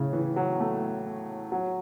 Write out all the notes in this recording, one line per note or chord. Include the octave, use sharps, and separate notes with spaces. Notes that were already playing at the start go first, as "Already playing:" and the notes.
Already playing: A2 C#3
E3
F#3
A3
F#3